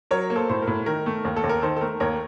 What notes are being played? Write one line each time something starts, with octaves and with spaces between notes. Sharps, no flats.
F#3 A#4 C#5
A#3
A4 C5
A2 C5
A#4
A2
D#3 A#4
A3
D#2
A4
D#2
A#4
D#3 A4 C5
A4
A3 A#4
D#2 A#4 C#5